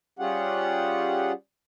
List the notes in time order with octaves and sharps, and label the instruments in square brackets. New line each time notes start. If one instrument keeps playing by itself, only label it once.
[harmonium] G3 C#4 F4 G4 G#4 F#5